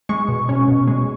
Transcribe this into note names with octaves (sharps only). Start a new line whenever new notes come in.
G#3 C#6
B2
C#4
B2
G#3